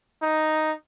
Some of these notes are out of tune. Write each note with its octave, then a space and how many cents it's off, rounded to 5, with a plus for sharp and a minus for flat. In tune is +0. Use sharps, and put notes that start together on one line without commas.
D#4 +0